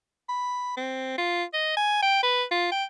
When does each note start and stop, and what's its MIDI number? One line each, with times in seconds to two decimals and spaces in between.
0.29 0.73 83
0.77 1.17 60
1.18 1.44 65
1.53 1.75 75
1.77 2.00 80
2.03 2.22 79
2.23 2.44 71
2.51 2.70 65
2.72 2.84 79